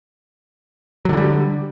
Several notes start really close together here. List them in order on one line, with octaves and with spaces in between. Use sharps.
F#3 D3 E3 G3